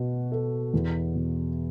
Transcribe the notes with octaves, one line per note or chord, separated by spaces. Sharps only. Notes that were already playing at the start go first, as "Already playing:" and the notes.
Already playing: B2 F#4
A4
E2
B2